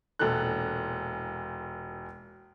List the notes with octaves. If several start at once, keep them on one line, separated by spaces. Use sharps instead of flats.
E1 A#2 A4 F#6